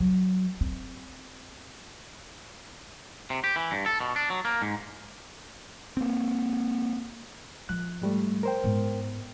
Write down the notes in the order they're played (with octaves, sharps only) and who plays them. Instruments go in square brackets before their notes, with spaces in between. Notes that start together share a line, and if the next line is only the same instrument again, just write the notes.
[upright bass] F#3
C4
[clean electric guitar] C3
G4
E3
G2
A4
B2
D4
F#3
A#3
G#2
[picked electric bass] A#3 C4
[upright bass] F3 [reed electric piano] F#6
[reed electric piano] G#2 G3 A3
A#4 C5 G5
[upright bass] G#2 B3